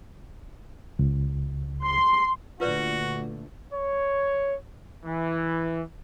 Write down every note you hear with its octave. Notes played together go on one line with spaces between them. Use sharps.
C#2
C6
A#2 D3 A3 F4 F#4 B4 D5
C#5
E3